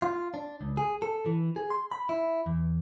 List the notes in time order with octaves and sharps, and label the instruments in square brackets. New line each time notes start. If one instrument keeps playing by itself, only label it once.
[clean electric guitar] F4
D4
C#2
G#4
A4
E3
G#4
C6
B5
E4
E2